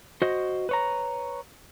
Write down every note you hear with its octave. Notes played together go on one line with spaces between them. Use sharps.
F#4 C5 D#5
B4 C#5 A#5